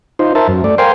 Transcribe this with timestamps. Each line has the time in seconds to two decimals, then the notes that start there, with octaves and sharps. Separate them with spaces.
0.19 D#4 F4 C5
0.35 A#4 C5 E5 A5
0.48 F#2
0.64 A3 D5
0.78 A#4 C5 F5 G5 G#5 C6